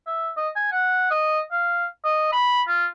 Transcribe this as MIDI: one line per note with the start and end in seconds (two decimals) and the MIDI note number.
0.07 0.30 76
0.37 0.49 75
0.56 0.68 80
0.71 1.10 78
1.11 1.40 75
1.52 1.86 77
2.05 2.30 75
2.32 2.62 83
2.68 2.86 65